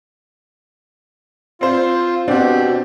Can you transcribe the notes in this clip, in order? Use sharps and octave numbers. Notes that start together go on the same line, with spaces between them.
C4 F4 C5
B2 C4 D4 F#4 G4